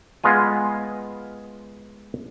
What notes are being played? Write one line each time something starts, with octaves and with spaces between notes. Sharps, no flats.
G#3 B3 F4 G#5